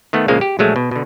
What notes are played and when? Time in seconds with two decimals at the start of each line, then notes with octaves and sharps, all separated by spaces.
0.13 D#3 A3 B3
0.28 A#1 C#3 F3 G#3 A#3 F5
0.41 G4
0.59 A#1 F#3 G#3 A3
0.76 B2
0.91 B2 D3